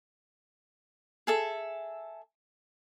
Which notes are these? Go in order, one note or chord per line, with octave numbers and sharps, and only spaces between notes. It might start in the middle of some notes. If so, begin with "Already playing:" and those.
G#4 A4 E5